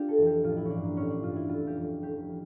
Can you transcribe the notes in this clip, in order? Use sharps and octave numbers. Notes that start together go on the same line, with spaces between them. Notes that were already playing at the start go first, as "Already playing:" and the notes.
Already playing: D4 F4 G4
A4
F2 E3
G4
A1 F4
E4
E3 C#4 D4
G2
A#3
A1 C#4
D4
G2 E3 F4
E4
F1 F4
G4
F2 E3
F1 G4
E3